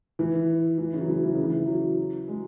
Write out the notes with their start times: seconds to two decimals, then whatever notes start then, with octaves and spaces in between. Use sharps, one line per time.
0.19 E3
0.78 E3
0.93 C#3
1.01 F#3
1.08 E3
1.23 E3
1.34 C#3
1.44 E3
1.67 F#3
2.28 G#3